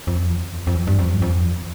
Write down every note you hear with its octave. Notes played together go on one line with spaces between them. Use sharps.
F2
E2
F2
F2
E2
G2
F2
G2
F2
E2